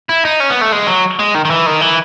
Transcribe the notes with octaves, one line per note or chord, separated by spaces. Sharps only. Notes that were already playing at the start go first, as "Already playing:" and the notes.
E4
D#4
C#4
B3
A3
G#3
F#3
G#3
D#3
D#3
E3
D#3
E3